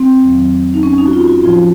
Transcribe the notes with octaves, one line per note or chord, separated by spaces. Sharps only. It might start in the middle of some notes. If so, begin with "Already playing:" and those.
Already playing: C4
F2 D#3 F#3
D#4
C#4
D#4
F#4
F4
F#4
A2 F3 F4